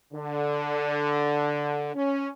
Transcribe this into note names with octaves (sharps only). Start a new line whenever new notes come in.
D3
C#4